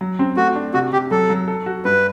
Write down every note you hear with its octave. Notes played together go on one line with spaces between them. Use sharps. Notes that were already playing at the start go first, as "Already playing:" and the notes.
F#3
C4
A3 F#4
D4
C3 F#4
C3 G4
F#3 A4
F#3
A4
F#4
G2 B4